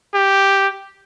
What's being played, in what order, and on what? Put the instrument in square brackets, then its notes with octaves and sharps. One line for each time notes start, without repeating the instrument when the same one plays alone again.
[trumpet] G4